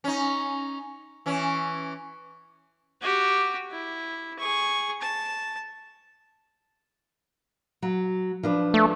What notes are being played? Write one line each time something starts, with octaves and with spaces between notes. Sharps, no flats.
C#4 D#4
E3 C#4
F#4 G4
E4
G#4 C#6
A5
F#3
F3 D4 B4
A3